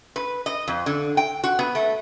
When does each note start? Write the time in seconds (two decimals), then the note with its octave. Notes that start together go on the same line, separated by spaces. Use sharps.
0.16 B4
0.46 D#5
0.68 F2
0.86 D3
1.17 G5
1.44 F#4
1.59 B3
1.75 A3